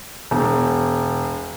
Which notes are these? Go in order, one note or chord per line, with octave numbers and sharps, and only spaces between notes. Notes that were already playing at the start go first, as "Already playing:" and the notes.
E1